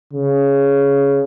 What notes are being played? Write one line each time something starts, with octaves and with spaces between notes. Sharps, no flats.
C#3